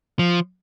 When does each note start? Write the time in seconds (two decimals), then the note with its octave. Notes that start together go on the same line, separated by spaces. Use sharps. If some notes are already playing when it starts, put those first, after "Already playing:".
0.19 F3